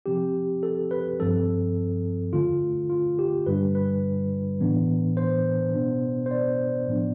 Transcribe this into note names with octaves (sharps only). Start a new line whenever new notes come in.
C3 F3 C4 G4
A4
B4
G2 F3 C4 A4
E2 D3 A3 F4
F4
G4
G2 D3 G3 D4 B4
B4
A2 E3 B3 D4
C5
B2 B3 D4
C5
D5
A2 F3 B3 D4